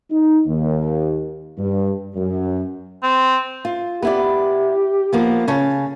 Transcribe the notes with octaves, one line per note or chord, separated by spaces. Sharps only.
D#4
D#2
G2
F#2
C4
F4
B3 E4 G4 D5
F3 A#3 B3
C#3 C#5 A5